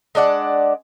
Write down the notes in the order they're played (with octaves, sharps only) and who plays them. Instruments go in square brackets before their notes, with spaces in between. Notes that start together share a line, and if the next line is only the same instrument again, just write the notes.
[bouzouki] G#3 D4 D5 F#5